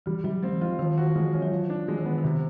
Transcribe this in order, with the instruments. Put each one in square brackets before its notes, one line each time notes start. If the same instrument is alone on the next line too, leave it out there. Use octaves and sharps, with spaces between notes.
[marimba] E3 [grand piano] G3
[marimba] F#3 [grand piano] G3
[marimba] G#3 [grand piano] C4
[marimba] E3
[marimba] F3 [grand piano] F4
[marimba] D#3 [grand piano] F3
[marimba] D#3 [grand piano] F#4
[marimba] E3 [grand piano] G#3
[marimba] F3
[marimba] E3 [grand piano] C#4
[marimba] F#3
[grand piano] F3
D4
[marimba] E3 [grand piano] G#3
[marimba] D#3
[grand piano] B3
[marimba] D#3
[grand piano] C3